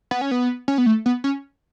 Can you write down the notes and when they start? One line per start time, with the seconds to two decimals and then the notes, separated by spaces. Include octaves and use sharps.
0.11 B3
0.21 C#4
0.31 B3
0.68 C#4
0.78 B3
0.86 A3
1.06 B3
1.24 C#4